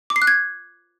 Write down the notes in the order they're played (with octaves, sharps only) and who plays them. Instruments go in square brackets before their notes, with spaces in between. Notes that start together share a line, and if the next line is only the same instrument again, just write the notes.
[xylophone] D6
C7
F#6
G#6